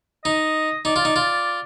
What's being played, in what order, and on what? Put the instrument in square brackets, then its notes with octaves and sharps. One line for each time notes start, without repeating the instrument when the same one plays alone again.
[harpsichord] D#4 [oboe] D#5
[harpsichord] D#4 [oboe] D5
[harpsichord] F4
D#4
F4